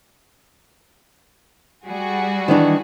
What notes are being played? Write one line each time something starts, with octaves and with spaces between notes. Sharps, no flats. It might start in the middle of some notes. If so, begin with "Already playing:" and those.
G3 F#4 G#4
D#3 E3 D4